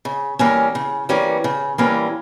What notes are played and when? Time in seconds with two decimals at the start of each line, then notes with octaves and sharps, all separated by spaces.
0.05 C#3
0.39 E3 G3 A#3 C#4
0.75 C#3
1.09 E3 G3 A#3 C#4
1.44 C#3
1.78 E3 G3 A#3 C#4